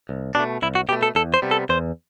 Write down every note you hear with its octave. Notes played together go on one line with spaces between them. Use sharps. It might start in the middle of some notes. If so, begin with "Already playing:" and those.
C2
B2 A3 D4
C2 E4
F#4
B2 A3 G4
A4
E2 A4
C5
C3 G3 B3
A4
E2 C5